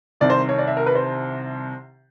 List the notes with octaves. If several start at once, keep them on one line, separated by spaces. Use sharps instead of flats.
C2 C3 D#3 D5
C5
C#5
D5
E5
A#4
B4
C5